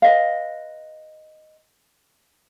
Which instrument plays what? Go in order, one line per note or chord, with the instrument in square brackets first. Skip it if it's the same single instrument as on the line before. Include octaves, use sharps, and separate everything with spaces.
[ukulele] B4 D#5 F5